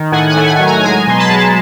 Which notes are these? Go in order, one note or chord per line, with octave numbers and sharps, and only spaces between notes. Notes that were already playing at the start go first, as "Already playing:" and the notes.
Already playing: D#3
A2 F#5 G#5
F#5 G#5
A3
F#5 G#5
F#3
G#5 A#5
G#3 G#5 A#5
B2 C6
A5 B5
G#3